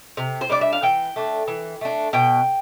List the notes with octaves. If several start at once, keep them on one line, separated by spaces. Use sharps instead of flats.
C3
C5
G3 D4 D5
E5
F5
E3 G5
A3 D4
E3
A3 D4
B2 G5